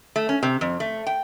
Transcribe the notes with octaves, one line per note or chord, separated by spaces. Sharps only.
A3
C#4
C3
F2
A3
G5